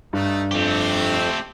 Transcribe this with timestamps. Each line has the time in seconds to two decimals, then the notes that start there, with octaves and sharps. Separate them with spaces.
0.13 G2 A3 D#4
0.51 F2 A3 C4 G4